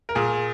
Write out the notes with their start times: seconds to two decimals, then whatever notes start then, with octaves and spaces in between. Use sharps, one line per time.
0.09 A#4
0.15 A#2 G#4